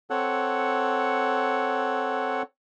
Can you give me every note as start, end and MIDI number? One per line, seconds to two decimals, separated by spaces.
0.10 2.42 60
0.10 2.42 69
0.10 2.42 73
0.10 2.42 78